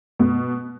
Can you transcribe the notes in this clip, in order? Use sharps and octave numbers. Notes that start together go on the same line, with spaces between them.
B2